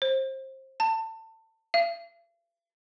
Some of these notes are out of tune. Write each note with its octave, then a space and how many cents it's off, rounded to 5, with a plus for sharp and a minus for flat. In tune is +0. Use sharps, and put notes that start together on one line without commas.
C5 +25
A5 +25
F5 -45